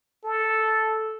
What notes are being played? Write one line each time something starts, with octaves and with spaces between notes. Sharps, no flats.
A4